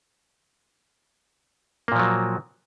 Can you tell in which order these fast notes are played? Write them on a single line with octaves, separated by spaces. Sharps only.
A#3 A#2 F3 F#3